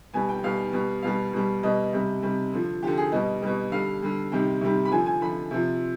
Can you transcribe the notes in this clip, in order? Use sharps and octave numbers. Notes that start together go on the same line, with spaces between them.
B2 G3 G#5
G5
B2 G3 F5
B2 G3
B2 G3 F5
B2 G3
B2 G3 D#5
C3 G3
C3 G3
D3 F3
D3 F3 G4
G#4
B2 G3 D#5
B2 G3
D3 G3 F5
D3 G3
C3 D#3 G3 G5
C3 D#3 G3
B5
D3 F3 G#5
G#5
D3 F3 B5
C3 F3